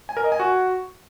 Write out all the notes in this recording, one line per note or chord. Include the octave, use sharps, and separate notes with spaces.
G#5
A#4
D#5
G#5
F#4